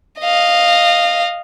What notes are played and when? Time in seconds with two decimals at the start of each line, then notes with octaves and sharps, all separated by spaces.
0.20 D#5 F5